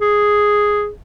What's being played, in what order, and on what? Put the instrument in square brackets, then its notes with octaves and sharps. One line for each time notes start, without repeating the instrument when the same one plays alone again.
[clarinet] G#4